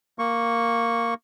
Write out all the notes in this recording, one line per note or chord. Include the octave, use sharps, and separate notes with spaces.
A#3 C#6